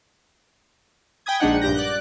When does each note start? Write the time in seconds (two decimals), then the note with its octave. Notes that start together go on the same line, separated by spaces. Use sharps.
1.26 G5 G#5 B5 D#6 G#6
1.40 A#1 G#3 D4 D#4 F#5
1.61 A#1 G2 G4 G6 A#6
1.75 D5 F#6